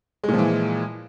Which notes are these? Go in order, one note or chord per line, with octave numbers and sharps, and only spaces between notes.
A#2 E3 F3 G#3